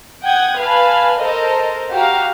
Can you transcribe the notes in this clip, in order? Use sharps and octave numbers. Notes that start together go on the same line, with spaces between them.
F#5 G5 D#6 G#6
B4 F5 G#5 A5 B5
A4 A#4 C5 D#5
F#4 G4 F5 A#5